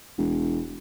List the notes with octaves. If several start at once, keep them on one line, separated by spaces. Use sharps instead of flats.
E1